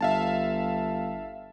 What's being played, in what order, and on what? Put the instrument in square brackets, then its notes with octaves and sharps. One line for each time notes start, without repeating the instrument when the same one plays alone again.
[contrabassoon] G1 [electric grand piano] E5 F5 A5